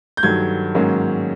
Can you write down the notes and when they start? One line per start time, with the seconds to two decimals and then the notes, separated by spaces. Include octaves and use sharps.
0.17 G6
0.23 G2 D#3 F#3 A3 G#6
0.75 G#2 D#3 F#3 A#3 C#4